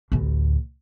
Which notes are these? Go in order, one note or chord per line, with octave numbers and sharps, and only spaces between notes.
A1 D2